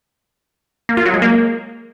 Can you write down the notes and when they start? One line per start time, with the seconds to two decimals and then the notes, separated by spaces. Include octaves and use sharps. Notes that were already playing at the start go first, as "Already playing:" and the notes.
0.89 A#3
0.97 F4
1.05 F#3
1.14 G#3
1.22 A#3